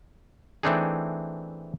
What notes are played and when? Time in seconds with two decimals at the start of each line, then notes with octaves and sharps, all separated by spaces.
0.63 E3 A3 C4 D4 D#4 G#4